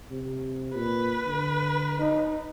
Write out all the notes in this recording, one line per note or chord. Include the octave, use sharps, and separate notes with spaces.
C3
A#2 B4
D3
D#4